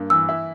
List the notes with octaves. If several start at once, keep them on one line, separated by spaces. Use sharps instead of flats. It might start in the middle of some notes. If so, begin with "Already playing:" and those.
Already playing: G2 A#3
E3 E6
E4